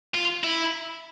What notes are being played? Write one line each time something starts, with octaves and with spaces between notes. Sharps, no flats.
F4
E4